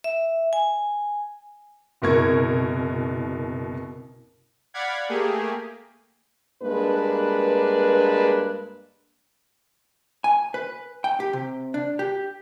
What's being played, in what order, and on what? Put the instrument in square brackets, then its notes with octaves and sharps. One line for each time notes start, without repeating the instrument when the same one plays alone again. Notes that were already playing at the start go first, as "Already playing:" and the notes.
[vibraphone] E5
G#5
[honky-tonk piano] F#1 C2 B2 A#4 C#6 G#6
[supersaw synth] D5 F5 F#5 B5 G#6
A3 A#3 G4 G#4
[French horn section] G2 G#3 A#3 D4 B4
[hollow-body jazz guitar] G#5
B4
G5
G4
C3
D4
G4